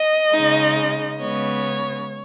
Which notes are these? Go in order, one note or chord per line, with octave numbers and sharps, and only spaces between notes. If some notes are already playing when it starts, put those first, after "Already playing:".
Already playing: D#5
C#3 G#3 D#4
C#3 G#3 B3 C#5